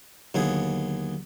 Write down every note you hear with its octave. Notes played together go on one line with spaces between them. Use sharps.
D#2 D3 F#3 B3 G#4